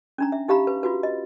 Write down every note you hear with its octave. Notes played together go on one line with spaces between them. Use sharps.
C#4 D4 A#5
E5
D#4 G4 F5 A#5 B5
B4
F4 F#4 B4
D#5